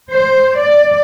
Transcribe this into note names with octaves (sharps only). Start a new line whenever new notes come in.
C5
D5